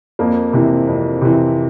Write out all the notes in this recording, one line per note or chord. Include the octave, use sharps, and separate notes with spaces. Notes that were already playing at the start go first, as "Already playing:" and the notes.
F2 A#3
C3 E3
F2
C3 E3